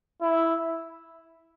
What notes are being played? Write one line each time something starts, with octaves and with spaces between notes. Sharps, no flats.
E4